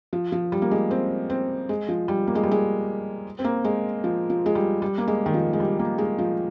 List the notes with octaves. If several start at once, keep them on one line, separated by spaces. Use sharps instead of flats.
F3
F3
G3
A#3
G#3
C4
C4
G#3
F3
G3
A#3
G#3
G3
G#3
C4
A#3
G#3
F3
F3
G#3
G3
G3
A#3
G#3
D#3
F3
G#3
G3
A#3
G#3
F3